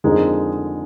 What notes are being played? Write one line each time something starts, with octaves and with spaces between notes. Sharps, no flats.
F2 D3 G#3 D#4 A#4